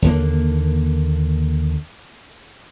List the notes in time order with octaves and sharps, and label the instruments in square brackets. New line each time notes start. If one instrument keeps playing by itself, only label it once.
[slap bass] D#2 D3 A#3